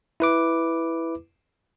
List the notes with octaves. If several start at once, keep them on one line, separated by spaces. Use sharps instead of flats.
E4 B4 D6